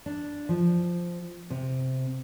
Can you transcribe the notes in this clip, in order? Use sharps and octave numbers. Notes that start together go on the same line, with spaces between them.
D4
F3
C3